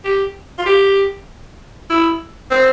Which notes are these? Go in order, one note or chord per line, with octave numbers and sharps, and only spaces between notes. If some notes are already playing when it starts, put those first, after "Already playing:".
G4
F4
G4
E4
C4